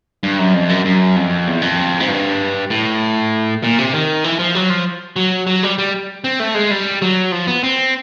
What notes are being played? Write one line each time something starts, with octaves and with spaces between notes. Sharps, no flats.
G2
F#2
F2
F#2
F#2
F2
E2
F2
G#2
G2
A2
A#2
C3
D#3
E3
F3
F#3
F3
F#3
F#3
G3
G3
C4
A3
G#3
G3
F#3
F3
B3
C4